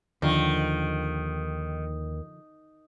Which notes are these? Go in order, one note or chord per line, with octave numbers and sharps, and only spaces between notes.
D#2 D3 D#3 F3